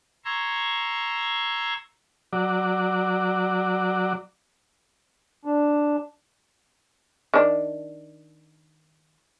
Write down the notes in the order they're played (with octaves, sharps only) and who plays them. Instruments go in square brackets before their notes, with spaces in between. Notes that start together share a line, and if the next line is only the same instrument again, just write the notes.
[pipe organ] A#5 C6 C#6 E6 G#6
[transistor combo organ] F#3 D5
[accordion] D4
[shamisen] D#3 D4